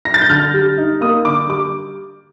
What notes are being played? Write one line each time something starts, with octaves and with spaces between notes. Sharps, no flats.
A#6
A6
G6
D3 F6
G3
D#4
A#3 D#6
D3 D6
G3 D6